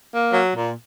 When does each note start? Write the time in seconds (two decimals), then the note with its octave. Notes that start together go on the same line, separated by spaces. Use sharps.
0.12 A#3
0.32 F#3
0.54 A#2